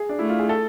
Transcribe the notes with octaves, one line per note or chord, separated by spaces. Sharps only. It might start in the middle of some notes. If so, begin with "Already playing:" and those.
Already playing: G#4
D4
A3 E4
F4
G#4
A4